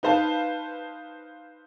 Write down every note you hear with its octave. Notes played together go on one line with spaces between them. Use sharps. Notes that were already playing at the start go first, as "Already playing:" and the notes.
D#4 B4 C5 F5 A5